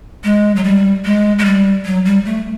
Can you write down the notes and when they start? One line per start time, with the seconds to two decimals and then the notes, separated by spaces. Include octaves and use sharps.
0.24 G#3
0.56 F#3
0.64 G3
1.05 G#3
1.39 G#3
1.45 G3
1.85 F#3
2.05 G3
2.25 A3